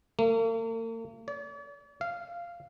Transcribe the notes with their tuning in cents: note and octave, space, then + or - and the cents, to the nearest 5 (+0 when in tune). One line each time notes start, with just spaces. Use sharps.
A#3 -45
D5 -45
F5 -10